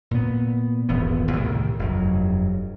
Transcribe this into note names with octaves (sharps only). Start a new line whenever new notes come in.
A#2 B3
D#1 G#1 E2 B3
C2 A2 C3 D#3
F1 G2 F#3